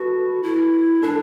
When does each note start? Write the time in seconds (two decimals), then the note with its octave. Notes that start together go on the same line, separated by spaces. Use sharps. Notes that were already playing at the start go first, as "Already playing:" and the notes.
Already playing: F#4 A4 B4
0.43 E4
1.03 D4 A4